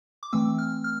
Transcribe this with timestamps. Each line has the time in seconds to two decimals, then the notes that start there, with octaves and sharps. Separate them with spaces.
0.23 D6
0.33 E3 A3 C4 E6
0.59 F6
0.84 F6